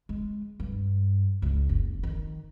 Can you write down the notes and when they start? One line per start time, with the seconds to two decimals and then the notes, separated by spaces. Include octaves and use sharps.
0.09 G#3
0.60 G2
1.42 C#2
1.69 F#1
2.03 D#3